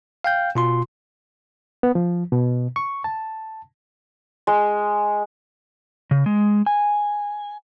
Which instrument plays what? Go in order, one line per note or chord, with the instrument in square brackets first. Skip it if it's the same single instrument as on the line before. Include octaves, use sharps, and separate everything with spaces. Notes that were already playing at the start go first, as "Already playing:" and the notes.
[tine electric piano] F5 G5 G6
B2 F4 C6
[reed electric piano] B3
F3
B2
C#6
A5
[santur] G#3
[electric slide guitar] C#3
G#3
G#5